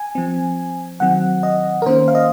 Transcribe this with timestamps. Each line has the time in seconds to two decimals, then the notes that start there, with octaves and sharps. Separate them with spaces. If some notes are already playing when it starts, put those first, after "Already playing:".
Already playing: G#5
0.15 F3 C4
1.00 D#3 F#3 C4 F#5
1.43 D#5
1.82 A#4
1.86 D#3 A#3 C#4 C5
2.08 F5
2.15 D#5